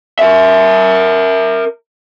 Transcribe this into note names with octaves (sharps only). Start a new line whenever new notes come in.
A#4 E5